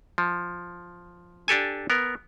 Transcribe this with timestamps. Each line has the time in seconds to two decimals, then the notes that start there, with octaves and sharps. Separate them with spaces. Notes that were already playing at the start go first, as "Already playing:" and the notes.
0.18 F3
1.48 D4 G4 A4 G#5
1.90 B3 A#4